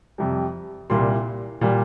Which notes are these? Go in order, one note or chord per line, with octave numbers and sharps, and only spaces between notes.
F2 C3 G3
C2 A#2 G3 C6
A#2 G3